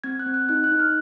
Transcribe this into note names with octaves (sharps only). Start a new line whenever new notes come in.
C4 G#6
F#6
C4
F#6
D#4 F#6
F#6
D#4
F6